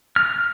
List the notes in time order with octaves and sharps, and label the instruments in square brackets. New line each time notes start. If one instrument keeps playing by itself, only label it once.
[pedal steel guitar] F6